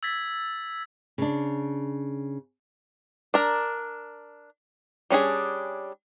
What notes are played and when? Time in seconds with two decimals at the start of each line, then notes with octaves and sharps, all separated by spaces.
0.03 E6 G#6 A6 B6
1.18 C#3 D4
3.34 D4 A#4
5.10 G3 C#4 D4 G#4